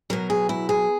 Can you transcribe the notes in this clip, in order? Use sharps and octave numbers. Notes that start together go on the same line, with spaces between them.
B2 F#3 A#4
G#4
E4
G#4